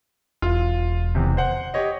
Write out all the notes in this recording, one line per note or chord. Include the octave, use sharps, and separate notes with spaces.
E1 F4
E2 C3
C5 F#5
G4 C#5 D#5